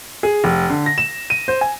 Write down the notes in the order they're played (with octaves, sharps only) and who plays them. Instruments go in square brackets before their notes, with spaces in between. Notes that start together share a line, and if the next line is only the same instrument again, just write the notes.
[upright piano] G#4
F1
D3
A#6
E7
D#7
C5
G#5